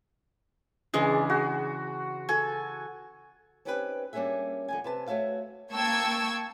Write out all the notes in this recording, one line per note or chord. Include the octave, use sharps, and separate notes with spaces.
C#3 E3 G#3 D4
F#4
A4 G#5
C4 C#4 D#4 G4 A#4 B4
G3 A#3 C#4 D4 G#4 E5
D3 F3 G#5
C3 B4 A5
A3 F#4 C#5 E5 F5
A#3 G5 A5 C#6 E6 G#6